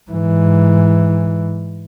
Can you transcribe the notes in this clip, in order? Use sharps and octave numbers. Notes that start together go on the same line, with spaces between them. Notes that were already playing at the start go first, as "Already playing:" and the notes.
G#2 E3